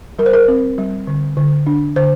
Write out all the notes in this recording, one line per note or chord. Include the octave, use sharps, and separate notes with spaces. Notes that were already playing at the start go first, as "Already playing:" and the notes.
G3 A#4
C5
A#4
C4
G3
D3
D3
D4
D3 C5